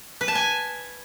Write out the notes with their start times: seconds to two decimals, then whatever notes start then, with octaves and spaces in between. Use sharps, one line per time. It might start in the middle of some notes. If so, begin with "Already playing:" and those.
0.21 B4
0.28 A5
0.35 G#5